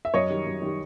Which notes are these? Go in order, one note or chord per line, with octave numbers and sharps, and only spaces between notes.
E5
F#2 C#5 D#5
D#3 G3
F#2
D#3 G3